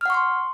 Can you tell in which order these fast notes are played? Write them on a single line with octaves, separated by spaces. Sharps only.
F6 F#5 C#6 C6